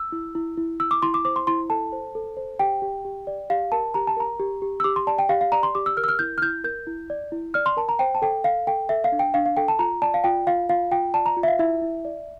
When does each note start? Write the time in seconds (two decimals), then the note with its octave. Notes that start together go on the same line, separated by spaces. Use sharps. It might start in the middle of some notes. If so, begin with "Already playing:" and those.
Already playing: E6
0.12 E4
0.35 E4
0.57 E4
0.80 E4 E6
0.91 D6
1.02 E4 C6
1.14 D6
1.25 C5 D6
1.36 C6
1.47 E4 C6
1.70 A4 A5
1.93 C5
2.15 A4
2.37 C5
2.59 G4 G5
2.82 G4
3.05 G4
3.27 D5
3.50 G4 F5
3.72 A#4 A5
3.94 G4 A#5
4.07 A5
4.17 A#4 A#5
4.39 G4
4.62 G4
4.80 E6
4.84 G4 D6
4.96 C6
5.07 D5 A5
5.19 G5
5.29 G4 F5
5.41 F5
5.52 D5 A#5
5.63 C6
5.75 G4 D6
5.86 E6
5.97 A#4 F6
6.04 E6
6.08 F6
6.19 E4 G6
6.38 F6
6.42 E4 G6
6.64 A#4 G6
6.87 E4
7.10 D5
7.32 E4
7.54 D5 F6
7.66 C6
7.77 A#4 A5
7.89 A#5
7.99 C5 G5
8.15 A5
8.22 A4 G5
8.44 A4 F5
8.67 A4 G5
8.89 A4 E5
9.04 F5
9.12 D4
9.19 G5
9.34 D4 F5
9.46 F5
9.57 A4 G5
9.68 A5
9.79 F4 A#5
10.02 D5 A5
10.14 F5
10.24 F4 G5
10.47 F4 F5
10.69 F4 F5
10.91 F4 G5
11.14 D5 A5
11.26 A#5
11.37 F4
11.43 E5
11.48 F5
11.59 E4 E5
11.82 E4
12.05 D5